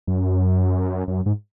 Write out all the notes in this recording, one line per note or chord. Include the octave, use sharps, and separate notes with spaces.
F#2
F#2
G#2